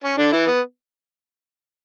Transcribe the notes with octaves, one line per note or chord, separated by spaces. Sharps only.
C#4
D3 D4
E3 E4
B3